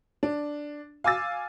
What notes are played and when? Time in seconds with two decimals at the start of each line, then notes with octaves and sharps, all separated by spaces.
0.23 D4
1.04 F5 G#5 D6 E6 A6